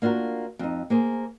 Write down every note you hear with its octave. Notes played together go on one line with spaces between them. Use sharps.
A#3 D4 F4 F#4 A#4
F2 D#4
A#3 G#4 C5